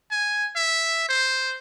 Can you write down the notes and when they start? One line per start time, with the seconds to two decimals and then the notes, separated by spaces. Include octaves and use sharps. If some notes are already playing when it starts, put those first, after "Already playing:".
0.11 G#5
0.56 E5
1.09 C5